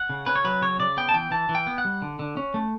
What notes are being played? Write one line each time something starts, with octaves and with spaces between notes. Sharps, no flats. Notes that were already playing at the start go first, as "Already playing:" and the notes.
Already playing: F#5
C#3
C#4 B4
C#5
F#3 B4
C#3 C#5
C#3 D5
B3 G5
A5
E3 G5
E3 A5
E3
G5
B3
F#5
G3
D3
D3
C#4
A3